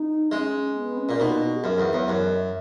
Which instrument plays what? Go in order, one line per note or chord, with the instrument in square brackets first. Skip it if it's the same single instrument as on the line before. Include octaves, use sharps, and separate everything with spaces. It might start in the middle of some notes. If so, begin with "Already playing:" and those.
Already playing: [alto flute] D#4
[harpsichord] G#3 [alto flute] C#4
[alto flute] B3
C#4
[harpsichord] A#2
[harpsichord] B2 [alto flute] D#4
[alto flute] F#4
G#4
[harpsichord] F#2 [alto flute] A#4
[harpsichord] E2 [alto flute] B4
[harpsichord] E2 [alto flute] C#5
[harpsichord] F#2 [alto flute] C#5
[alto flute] D#5
E5